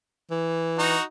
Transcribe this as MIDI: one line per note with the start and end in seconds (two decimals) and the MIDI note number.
0.31 0.96 52
0.79 1.02 63
0.79 1.02 66